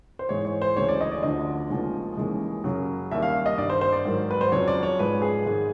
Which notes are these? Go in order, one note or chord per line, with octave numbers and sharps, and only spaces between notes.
C5
G#2 E3 G#3 C#5
C#5
C5
D2 C#3 E3 G#3 C#5
D5
D#5
D5
D2 D3 F3 D#5
D#2 C#3 F3 G#3
D#2 C#3 E3 G#3
F#2 C#3 F#3
D#2 D#3 G3 E5
F5
D#5
G2 D#3 G3 D5
C5
C5
D5
G#2 D#3 F#3
B4
C5
F2 C#3 F#3 C#5
D5
C#5
G#2 F3 G#3 B4
G#4
G#2 D#3 G#3